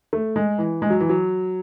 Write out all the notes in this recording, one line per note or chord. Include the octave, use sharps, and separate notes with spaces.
A3
G#3
E3
G#3
F#3
E3
F#3